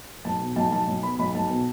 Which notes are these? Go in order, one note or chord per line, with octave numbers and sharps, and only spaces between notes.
B1 A5
B2
B1 A5
B1 A5
B1
B3 B5
B1 B5
B1 A5
B2